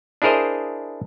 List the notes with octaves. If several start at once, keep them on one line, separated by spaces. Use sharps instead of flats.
D4 E4 G#4 A#4 C5 D#5